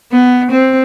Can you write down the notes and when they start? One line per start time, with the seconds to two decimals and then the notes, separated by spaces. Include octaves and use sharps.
0.12 B3
0.51 C4